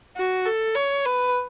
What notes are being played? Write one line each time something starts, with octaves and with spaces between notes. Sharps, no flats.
F#4
A4
C#5
B4